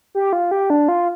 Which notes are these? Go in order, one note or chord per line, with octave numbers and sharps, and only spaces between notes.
G4
F4
G4
D4
F4